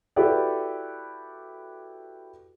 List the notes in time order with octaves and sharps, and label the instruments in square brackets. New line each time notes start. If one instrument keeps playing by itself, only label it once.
[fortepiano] E4 F#4 G4 A4 B4 D5